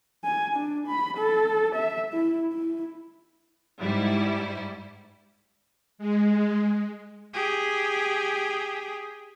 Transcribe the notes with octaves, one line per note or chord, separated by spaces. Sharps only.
G#5
D4
B5
A4
E5
E4
E4
G#2 G3 E4
G#3
G4 G#4